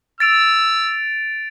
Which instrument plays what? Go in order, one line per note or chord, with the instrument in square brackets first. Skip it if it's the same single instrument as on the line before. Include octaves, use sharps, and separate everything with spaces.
[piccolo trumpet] E6 [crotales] A6 D7 F7